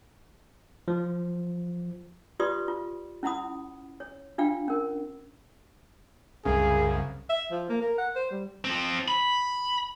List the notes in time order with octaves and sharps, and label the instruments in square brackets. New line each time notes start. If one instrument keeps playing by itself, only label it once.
[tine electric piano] F3
[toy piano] F4 G4 B4 D5 C6 D#6
F4
C#4 E4 F#5 B5 D#6
C#5
D4 F4 F5 G5
C#4 A#4
[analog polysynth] C2 F#2 C#3 [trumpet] G#4
[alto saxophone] E5
F3
A#3
A#4
F#5
C5
G3
[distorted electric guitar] F3 C4
B5